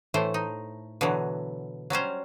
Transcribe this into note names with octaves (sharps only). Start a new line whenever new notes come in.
A2 E3 A3 C5
D#4
B2 D3 E3 F#3
F#3 G3 C#4 C5